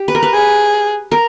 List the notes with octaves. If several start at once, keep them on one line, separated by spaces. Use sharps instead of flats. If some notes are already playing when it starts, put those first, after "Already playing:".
Already playing: G4
B4
A#4
B4
G#4
A#4